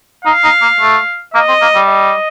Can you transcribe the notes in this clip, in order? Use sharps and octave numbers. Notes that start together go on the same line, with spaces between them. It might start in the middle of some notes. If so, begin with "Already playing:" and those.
D#4 F5
D#4
A#3
A3
A#3 D#5
C4
A#3
G3
D#5